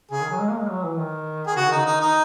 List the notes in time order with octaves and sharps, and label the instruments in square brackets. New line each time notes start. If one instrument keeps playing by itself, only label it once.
[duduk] C#3 [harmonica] G#4
[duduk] D#3
F#3
G#3
A#3
G#3
F#3
E3
D#3
[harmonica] G#4
[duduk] C#3 [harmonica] F#4
[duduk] D#3
[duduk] C#3 [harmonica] D#4
[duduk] D#3 [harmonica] D#4
[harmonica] D#4